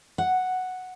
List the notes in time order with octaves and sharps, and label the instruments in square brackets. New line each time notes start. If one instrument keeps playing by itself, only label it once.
[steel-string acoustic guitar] F#5